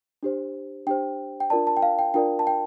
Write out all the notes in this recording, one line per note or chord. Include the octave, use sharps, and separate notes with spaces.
D4 G4 C5
D4 G4 C5 G5
G5
D4 F4 A#4 D5 A5
A5
G5
F5
G5
D4 F4 A#4 D5 G5
A5
G5